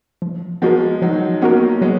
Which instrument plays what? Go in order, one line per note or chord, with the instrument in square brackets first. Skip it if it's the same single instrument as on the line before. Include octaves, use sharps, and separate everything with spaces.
[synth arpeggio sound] F3
[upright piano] F3 G#3 [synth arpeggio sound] B3 F#4 A#4
[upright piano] D#3 F#3 [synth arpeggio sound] F3
[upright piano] A#3 C#4 [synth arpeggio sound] B3 F#4 A#4
[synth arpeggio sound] F#3 [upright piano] G#3 B3